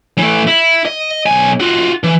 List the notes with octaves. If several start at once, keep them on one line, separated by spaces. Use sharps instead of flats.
E3 A3
E4
D#5
B1 G#5
F4 F#4
E3